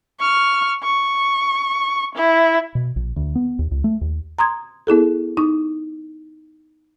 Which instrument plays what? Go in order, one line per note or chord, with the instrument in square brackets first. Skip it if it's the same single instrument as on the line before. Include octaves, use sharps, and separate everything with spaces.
[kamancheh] C#6 F6
C#6
E4
[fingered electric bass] B2
A#1
D2
B3
D#2
C#2
A3
D#2
[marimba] A#5 C6 D#6 G#6
B3 E4 G#4 A4
D#4 C#6 D#6